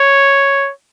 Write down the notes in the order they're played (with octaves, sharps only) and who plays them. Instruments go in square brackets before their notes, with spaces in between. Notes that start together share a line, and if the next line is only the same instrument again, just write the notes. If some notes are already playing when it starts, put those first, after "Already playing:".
Already playing: [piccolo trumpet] C#5